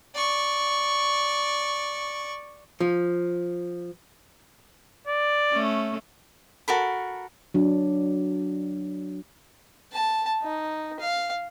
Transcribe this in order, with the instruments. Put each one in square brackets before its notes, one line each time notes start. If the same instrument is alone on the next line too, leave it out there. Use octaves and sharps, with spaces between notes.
[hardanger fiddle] D5 C#6
[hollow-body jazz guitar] F3
[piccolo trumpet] D5
[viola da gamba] A3 C#4
[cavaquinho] F#4 A4 A#4 B5
[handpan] F#3 D4
[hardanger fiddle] A5
D#4
F5